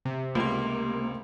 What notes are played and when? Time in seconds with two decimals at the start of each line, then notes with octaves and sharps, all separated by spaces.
0.05 C3
0.35 C#2 A3 A#3 C6